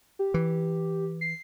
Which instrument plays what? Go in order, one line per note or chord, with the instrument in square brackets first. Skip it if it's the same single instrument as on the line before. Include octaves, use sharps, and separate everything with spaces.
[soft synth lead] G4
[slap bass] E3
[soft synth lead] C7